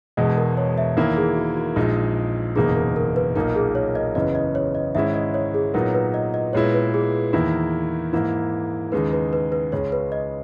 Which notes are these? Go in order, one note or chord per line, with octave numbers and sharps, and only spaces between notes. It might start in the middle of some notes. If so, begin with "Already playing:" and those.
E1 E2 B2 G#3 D#5
A#4
C#5
E5
E2 D#3 A#3 E4 A#4
G#4
F#4
F#4
A#1 A#2 G#3 D#4
F#1 E2 B2 A#3 D#4 G#4
A#4
A#4
B4
B1 A#2 A#3 D#4 A#4
G#4
C#5
D#5
F#1 E2 C#3 E3 B3 D#5
D#5
C#5
D#5
G#2 D#3 G#3 C#4 E4 E5
D#5
C#5
G#4
A#2 F#3 B3 D#4 A#4
B4
D#5
D#5
A#2 G#3 B3 E4 C#5
B4
G#4
E2 D#3 A#3 E4
G#2 E3 A#3 E4
D#2 C#3 G#3 D#4 B4
B4
B4
B4
C#2 C#3 G#3 C#4 C#5
B4
D#5